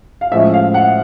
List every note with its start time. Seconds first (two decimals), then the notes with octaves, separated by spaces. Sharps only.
0.21 F5
0.31 A2 F3 G#3 C#4 E5
0.54 F5
0.74 F#5